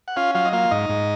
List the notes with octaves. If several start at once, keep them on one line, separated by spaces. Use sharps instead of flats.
F#5
C#4 F4 F5
F#3 F4 F5
D#5
A#3 F4 F5
G#2 D#4 D#5
G#2